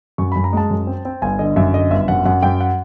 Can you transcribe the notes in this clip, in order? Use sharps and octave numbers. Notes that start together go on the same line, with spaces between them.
F#2 C#6
F#2 B5
A#5
G#3 A5
F#2
C4
C4
G1 G#5
D3 D#5
F#2 E5
D3 D#5
G1 E5
F#2 F#5
F#2 F#5
F#2 G5
F#5